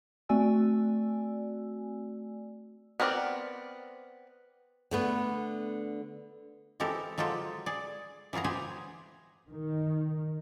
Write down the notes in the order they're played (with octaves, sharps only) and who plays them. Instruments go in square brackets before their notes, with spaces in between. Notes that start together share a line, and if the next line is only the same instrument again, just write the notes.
[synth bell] A3 C4 F#4 D5 G#5 E6
[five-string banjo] B3 C4 A#4 C#5 D5
[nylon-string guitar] D3 A3 B3
[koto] E3 G#3 C4 G4 A4 A#4
F#3 G#3 F4 G4 A4 C5
G#4 D5
E3 F#3 F4 G#4 A#5
G4 G#4 C5 G#5
[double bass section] D#3